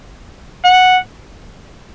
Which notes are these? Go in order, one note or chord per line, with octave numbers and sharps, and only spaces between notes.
F#5